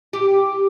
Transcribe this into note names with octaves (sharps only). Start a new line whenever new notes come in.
G4